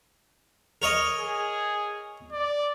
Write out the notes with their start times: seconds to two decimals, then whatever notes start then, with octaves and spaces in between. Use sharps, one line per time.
0.82 A#4 C#5 D#5
1.18 G#4
2.32 D5